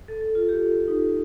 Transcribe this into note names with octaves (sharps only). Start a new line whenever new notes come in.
A4
A4
F4
G4
D#4